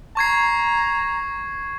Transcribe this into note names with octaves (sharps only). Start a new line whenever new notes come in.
A#5 C#6 G#6 C7